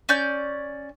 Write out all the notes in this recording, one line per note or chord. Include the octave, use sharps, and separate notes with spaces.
C#4 D5 G6